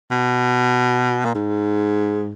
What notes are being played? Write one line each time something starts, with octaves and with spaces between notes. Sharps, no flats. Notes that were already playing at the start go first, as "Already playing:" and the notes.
B2
A#2
G#2